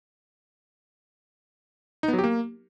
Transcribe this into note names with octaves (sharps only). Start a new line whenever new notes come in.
D#4
B3
F#3
G4
A#3